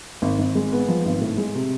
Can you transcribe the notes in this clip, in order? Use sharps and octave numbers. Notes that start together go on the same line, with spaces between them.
G#1
G#1
G#3
B3
F3
G#1
A2
G#3
C3